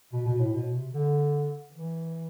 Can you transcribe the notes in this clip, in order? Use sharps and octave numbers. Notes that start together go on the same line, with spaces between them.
B2
B2
A2
B2
C3
D3
E3